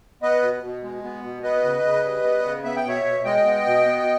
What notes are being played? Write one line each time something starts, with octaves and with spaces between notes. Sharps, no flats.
B3 B4 D#5
B2
B2
G#3
B3
B2
B3 B4 D#5
C#3
C#3
G3
B3
C#3
B3 E5
G5
B2 C#5 E5
B2
G#3 D#5 G5
B3
B2
B3